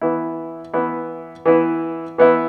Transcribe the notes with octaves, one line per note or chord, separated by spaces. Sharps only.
E3 B3 E4
E3 B3 E4
E3 B3 E4
E3 B3 E4